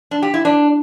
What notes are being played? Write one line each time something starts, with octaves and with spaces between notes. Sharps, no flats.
D4
G4
E4
D4